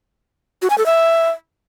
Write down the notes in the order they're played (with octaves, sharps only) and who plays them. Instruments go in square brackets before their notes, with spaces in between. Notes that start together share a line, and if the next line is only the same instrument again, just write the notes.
[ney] F#4
G#5
A4
E5